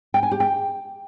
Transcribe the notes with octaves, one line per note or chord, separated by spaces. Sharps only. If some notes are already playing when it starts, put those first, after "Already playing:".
G5
G#5
G4
G5